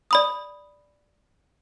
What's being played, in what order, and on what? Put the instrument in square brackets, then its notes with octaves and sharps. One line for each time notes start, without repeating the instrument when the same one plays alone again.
[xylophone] D5 B5 D#6